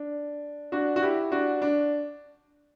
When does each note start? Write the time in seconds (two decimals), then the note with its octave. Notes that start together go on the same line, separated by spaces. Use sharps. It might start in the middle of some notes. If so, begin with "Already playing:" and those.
Already playing: D4
0.72 D4 F#4
0.96 F#4
1.02 E4 G4
1.32 D4 F#4
1.62 D4